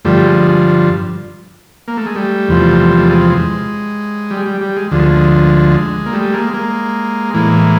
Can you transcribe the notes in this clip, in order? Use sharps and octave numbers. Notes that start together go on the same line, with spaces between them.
G2 D3 F3 G3 A3
G#3
A#3
A3
G#3
G3 A3
E2 C3 F3
A3
G#3
G3
G3
G3
G#3
D2 D3 F3 G#3
A3
G#3
A#3
G3 A3
G#3 A#3
G#3 A#3
A2 E3 G#3 A#3